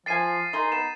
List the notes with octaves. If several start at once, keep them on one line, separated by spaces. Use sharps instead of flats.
F3 G5 G#5 A6 C7 D#7
D#3 D#4 G#4 C6
B3 E7